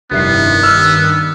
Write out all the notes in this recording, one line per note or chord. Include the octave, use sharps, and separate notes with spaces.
F1 G2 D#3 B3 E4 C7
E6 F6